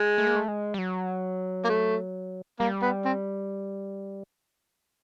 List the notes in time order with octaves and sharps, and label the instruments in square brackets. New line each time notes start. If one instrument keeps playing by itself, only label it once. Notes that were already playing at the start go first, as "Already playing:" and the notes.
Already playing: [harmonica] G#3
[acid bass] A3
A#3
A3
G#3
G3
F#3
[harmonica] A#3
A3
[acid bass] G3 [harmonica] A#3
[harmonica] B3
C4